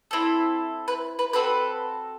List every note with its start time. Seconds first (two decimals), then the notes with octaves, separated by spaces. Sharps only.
0.11 C4 E4 A4
0.88 B4
1.19 B4
1.33 C4 F#4 A4 B4